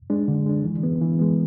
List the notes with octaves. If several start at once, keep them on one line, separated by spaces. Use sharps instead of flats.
G#3 D4
D3
G#3 D4
E3
G#3 B3
E3
G#3 B3